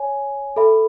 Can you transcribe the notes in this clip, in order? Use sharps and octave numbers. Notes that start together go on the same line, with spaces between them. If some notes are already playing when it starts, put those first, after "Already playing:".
Already playing: C#5 G#5
A4 E5 B5